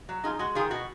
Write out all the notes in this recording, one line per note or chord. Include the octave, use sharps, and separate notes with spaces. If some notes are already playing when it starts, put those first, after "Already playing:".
F#3
D#4 F4 G#4
G#3 F#4
D#3 F4 G#4
B2 F#4